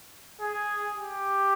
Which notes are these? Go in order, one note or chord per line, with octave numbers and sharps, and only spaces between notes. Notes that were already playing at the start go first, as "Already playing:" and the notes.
G#4
G4